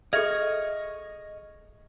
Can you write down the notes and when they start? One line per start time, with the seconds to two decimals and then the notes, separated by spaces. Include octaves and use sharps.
0.13 G#4 A4 D#5 E5 C#6 F6 G#6